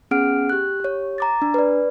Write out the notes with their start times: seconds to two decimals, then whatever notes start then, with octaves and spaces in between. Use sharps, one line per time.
0.11 B3 C#4 G#4 F#5 F6 D7
0.50 G4 F#6
0.80 G4 C#5
1.18 A#5 D6 A6
1.42 D4
1.54 B4 D5